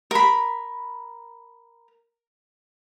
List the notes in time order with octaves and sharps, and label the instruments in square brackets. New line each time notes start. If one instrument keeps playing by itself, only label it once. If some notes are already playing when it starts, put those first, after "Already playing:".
[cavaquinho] A#4 B5